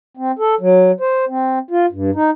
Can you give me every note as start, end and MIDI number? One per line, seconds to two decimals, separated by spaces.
0.17 0.32 60
0.39 0.55 69
0.61 0.91 54
1.00 1.25 72
1.28 1.59 60
1.71 1.86 65
1.92 2.11 43
2.15 2.30 63